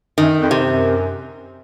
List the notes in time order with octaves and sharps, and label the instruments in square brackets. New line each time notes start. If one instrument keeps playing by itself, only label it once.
[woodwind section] F#2 [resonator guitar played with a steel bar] D#3
[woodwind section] F2
[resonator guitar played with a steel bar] C3
[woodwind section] F#2